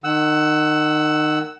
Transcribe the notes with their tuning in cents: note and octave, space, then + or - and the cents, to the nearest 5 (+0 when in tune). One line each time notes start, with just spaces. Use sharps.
D#3 -25 F#5 +15 E6 +0